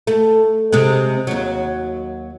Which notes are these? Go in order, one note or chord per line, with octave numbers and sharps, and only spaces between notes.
A3
C3 G#3
D#2 F#3